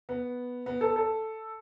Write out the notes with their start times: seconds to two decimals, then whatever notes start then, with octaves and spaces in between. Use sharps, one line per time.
0.09 B3
0.66 B3
0.81 A4
0.96 A4